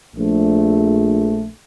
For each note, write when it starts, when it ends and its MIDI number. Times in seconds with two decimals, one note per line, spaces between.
0.16 1.47 34
0.16 1.47 57